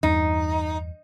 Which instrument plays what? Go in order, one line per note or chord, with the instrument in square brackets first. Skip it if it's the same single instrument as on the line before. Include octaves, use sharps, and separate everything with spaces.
[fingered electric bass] E2 G2 E3 [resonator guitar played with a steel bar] D#4